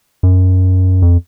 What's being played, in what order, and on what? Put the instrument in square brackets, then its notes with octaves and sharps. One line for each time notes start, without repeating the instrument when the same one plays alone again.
[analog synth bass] F#2
F2